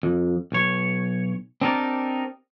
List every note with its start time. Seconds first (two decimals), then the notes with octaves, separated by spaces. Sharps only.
0.03 F2
0.52 B1 C#5
1.61 C4 D4 D#4 G4 A#4 D5